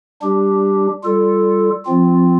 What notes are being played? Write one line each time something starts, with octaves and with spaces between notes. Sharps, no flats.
G3 D4 G4
G3 F4 A4
F3 C4 F4